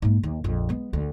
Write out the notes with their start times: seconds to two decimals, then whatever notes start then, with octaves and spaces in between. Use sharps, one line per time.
0.02 G#2 A#3
0.23 D#2
0.44 A#1 F2
0.69 G#3 B3
0.93 D2